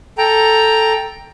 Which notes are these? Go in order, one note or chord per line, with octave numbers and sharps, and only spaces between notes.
A4 G5 A#5